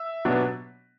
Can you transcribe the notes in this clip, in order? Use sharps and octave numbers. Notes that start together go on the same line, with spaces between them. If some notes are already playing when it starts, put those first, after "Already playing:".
Already playing: E5
B2 F#3 B3 D4